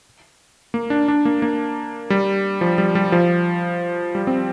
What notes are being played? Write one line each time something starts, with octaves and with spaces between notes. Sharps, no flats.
A#3
D4
D4
A#3
A#3
G3
F3
G3
G3
F3
G3
C4